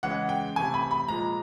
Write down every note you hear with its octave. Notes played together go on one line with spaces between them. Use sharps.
C#3 E3 G#3 F#5
G5
C3 E3 A3 G#5
B5
B5
A#2 F3 G#3 A#5